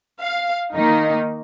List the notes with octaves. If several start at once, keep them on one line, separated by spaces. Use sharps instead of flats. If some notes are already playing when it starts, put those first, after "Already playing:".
F5
D#3 A#3 D#4